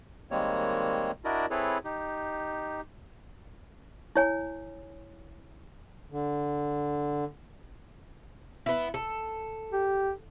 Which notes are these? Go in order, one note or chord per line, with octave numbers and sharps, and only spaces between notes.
D#3 G3 G#3 A#3 C4 C#5
D4 E4 F#4 A#4 D5 D#5
C4 E4 G#4 A4 B4 C#5
D#4 G4
E4 C#5 G#5
D3
B3 E4
A4
G4